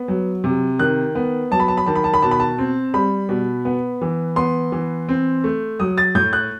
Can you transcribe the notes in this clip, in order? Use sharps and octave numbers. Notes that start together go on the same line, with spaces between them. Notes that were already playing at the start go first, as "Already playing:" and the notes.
Already playing: B3
F#3
C3
D#3 F#6
B3
F#3 A5
B5
A5
B5
D#3 A5
B5
A5
B5
B2 A5
B5
A5
C4
G3 B5
B2
B3
E3
B3 C6
E3
C4
A3
F#3 D#6
A6
A2 G6
F#6